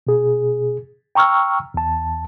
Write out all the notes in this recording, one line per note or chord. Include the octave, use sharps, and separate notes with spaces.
B2 G#4
G5 A#5 C#6 E6 F6
E2 A5